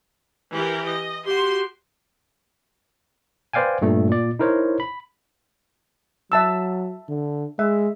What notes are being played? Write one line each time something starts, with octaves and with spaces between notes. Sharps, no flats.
E3 G4 A#4
D#5
F#4 G4 C6
B4 C5 D5 F5 G5 G#5
G2 A#2 A3
A#2 D5
D#4 E4 A#4 C5 C#5
B5
F#3 E5 A5 E6
D3
G#3 E5